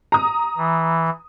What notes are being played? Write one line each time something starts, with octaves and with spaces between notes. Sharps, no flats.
A#5 D#6
E3